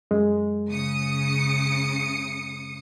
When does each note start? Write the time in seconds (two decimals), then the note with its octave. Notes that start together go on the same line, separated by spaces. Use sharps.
0.11 F#2 G#3
0.70 C#3 D#6 C#7